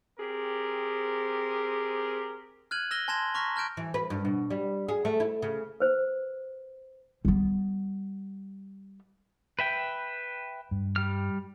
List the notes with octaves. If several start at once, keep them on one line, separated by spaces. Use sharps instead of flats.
C4 G4 G#4 A#4
F6 F#6 G#6 D#7 F#7
E6 F6 A#6 E7 G7
G#5 A5 C6 G#6 A#6 E7
A5 A#5 C#6 F6 A#6 B6
A5 F6 G6 D7 E7
E3
B4
G2
B2
G3
G#4
A3
E4
C#3
B4 C5
G3 B3
B4 E5 G5
G2
G3 F6